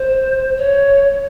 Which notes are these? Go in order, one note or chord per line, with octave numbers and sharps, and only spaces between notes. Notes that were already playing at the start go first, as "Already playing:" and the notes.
Already playing: C5
C#5